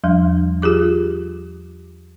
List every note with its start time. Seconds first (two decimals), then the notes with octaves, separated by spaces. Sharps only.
0.04 E2 F3 G3 D4
0.62 F4 G4 G#4 D6